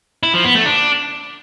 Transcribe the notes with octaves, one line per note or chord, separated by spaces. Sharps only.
E4
F3
B3
A3
D4